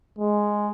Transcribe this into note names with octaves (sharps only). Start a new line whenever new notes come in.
G#3